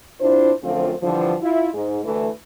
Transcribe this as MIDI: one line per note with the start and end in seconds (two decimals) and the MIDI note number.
0.20 0.51 48
0.20 0.51 62
0.20 0.51 64
0.20 0.51 65
0.20 0.51 72
0.63 0.92 42
0.63 0.92 50
0.63 0.92 53
0.63 0.92 57
0.63 0.92 60
0.63 0.92 65
1.02 1.35 43
1.02 1.35 50
1.02 1.35 52
1.02 1.35 53
1.41 1.69 64
1.41 1.69 65
1.74 1.99 44
2.04 2.28 38
2.04 2.28 52
2.04 2.28 57